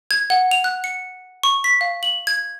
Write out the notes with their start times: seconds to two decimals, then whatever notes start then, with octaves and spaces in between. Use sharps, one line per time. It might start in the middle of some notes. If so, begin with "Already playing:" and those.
0.11 G#6
0.30 F#5
0.51 F7
0.64 F#6
0.84 C#7
1.43 C#6
1.64 B6
1.81 F5
2.03 F#7
2.27 G#6